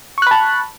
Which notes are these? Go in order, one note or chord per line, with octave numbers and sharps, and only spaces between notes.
A5 B5 C#6 F#6